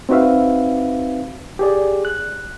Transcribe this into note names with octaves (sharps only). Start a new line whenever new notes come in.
C4 D#4 F#4 B4 E5 F5
G4 G#4 D5
F#6